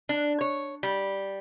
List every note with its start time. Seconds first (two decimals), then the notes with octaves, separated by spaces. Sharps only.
0.09 D4
0.41 C#5
0.83 G3